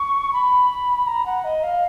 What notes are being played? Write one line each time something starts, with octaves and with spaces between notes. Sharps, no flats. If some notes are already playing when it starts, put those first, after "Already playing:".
Already playing: C#6
B5
A#5
F#5
D#5
F5